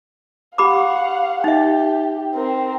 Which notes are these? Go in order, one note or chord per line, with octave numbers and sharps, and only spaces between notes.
G4 F5 F#5 B5 D6
D#4 G4 E5
C4 A#4